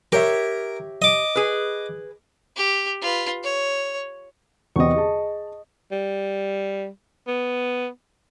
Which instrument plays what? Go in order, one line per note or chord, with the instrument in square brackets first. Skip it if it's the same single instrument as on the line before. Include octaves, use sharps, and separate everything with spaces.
[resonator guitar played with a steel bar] G4 C#5 E5 [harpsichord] A#4
[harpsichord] D#5 D6
[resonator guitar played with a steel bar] G#4 B4
[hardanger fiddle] G4
F4 B4
C#5
[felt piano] E2 C3 C4 [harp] D#5 C#6
[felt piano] G#4 A5
[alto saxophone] G3
B3